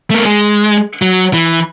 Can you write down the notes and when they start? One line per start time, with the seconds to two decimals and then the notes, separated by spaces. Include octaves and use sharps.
0.10 A3 A#3
0.25 G#3
1.02 F#3
1.33 E3